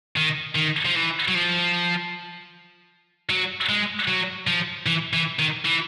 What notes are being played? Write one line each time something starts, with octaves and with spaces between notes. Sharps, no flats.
D#3
D#3
F3
E3
F#3
F3
F#3
G#3
F#3
F3
E3
E3
D#3
E3